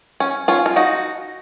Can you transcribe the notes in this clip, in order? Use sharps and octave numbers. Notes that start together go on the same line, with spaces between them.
C#4
C#4 F4
F4
D#4 F#4